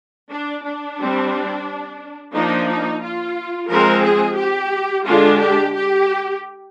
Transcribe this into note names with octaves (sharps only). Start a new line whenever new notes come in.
D4
D4
G3 C4
F3 A#3 D4 D#4
D#4
F4
F3 G#3 C4 A#4
G#4
G4
D3 G#3 D4 F4
G4
G4